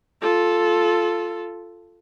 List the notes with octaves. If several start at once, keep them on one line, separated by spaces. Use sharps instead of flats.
F4 A4